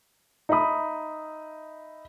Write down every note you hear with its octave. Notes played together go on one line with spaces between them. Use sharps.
D#4 D#5 E5 B5 D#6